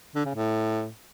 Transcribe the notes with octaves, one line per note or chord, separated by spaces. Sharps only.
D3
C#3
A2